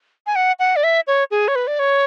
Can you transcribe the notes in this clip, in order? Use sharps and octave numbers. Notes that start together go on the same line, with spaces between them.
G#5
F#5
F#5
D5
E5
C#5
G#4
C#5
B4
D5
C#5